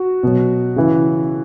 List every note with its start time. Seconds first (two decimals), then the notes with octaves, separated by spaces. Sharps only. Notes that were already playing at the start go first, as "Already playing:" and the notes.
Already playing: F#4
0.23 B2 F#3
0.76 C#3 E3